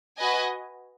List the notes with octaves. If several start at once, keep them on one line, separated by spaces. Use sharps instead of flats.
F#4 B4 D#5 G#5